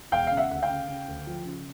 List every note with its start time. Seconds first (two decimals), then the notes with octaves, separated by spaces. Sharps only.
0.12 E1 F5 G5
0.27 C#3 F5
0.37 E5 F#5
0.50 D2 F#5
0.62 F5 G5
0.69 C#3
0.88 C#3
1.08 D2
1.27 F3
1.45 C#3